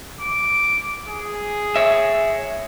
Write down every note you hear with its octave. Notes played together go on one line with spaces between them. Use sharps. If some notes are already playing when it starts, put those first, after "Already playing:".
D6
G#4
C#5 E5